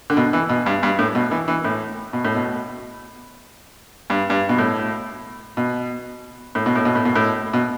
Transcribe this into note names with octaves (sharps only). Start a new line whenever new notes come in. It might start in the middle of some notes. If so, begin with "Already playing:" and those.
D3
B2
E3
B2
G2
G2
A2
B2
E3
E3
A2
B2
A2
B2
G2
G2
B2
A2
B2
A2
B2
A2
B2
A2
B2
A2
B2